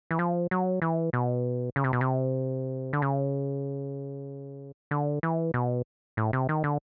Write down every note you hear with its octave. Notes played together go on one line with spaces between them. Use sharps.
E3
F3
F#3
E3
B2
C#3
C3
B2
C3
D3
C#3
D3
E3
B2
A2
C3
D#3
D3